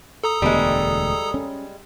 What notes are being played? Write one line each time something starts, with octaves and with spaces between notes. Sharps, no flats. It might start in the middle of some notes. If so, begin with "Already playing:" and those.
A4 A#5 D#6
E1 D2 G3 G#3 B3
C#4